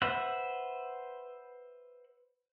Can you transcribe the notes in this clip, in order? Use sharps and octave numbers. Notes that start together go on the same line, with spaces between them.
B4 C5 E5 F#5